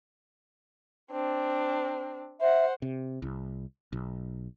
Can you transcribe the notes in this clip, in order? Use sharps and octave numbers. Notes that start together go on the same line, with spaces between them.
C4 D4
C5 E5 F#5
C3
C2
B1